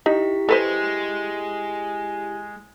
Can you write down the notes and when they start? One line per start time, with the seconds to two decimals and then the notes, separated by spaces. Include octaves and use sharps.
0.06 D#4 E4 G4 B6
0.49 G#3 A4 B4 C5